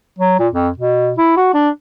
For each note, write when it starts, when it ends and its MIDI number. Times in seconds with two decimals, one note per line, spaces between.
0.18 0.38 54
0.39 0.48 46
0.53 0.69 41
0.78 1.13 47
1.18 1.32 64
1.37 1.50 66
1.54 1.69 62